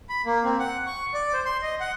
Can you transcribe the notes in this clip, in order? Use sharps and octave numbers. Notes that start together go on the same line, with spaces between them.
B5
A#3
C4
F#5
C#6
D5
C5
C6
D#5
F#5